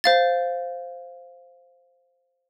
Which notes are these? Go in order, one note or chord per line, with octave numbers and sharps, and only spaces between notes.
C5 F5 A6